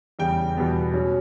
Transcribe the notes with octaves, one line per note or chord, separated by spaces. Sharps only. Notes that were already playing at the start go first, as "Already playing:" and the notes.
E2 C#3 G3 G5
E2 B2 G3 B3
B2 F#3 C#4